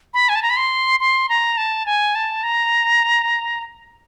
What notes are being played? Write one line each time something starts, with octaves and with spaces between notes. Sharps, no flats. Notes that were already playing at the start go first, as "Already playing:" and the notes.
B5
G#5
A5
A#5
B5
C6
C6
A#5
A5
G#5
A5
A#5